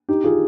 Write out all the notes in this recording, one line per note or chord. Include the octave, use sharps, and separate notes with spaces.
D#4 G4
F4 G#4